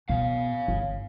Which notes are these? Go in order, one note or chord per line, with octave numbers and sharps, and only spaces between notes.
B2 C#5 F5
G1